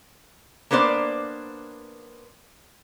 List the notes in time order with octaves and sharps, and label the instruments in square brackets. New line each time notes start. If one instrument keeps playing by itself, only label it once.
[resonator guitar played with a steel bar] A#3 B3 D4 C5 D5